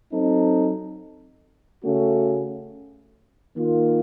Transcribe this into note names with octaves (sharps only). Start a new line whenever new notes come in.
F#3 C4 D#4 A4
C#3 A3 C#4 F#4
D#3 A#3 F4